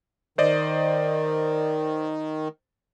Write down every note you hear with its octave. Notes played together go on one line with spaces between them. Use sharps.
D#3 C5 D5 D#5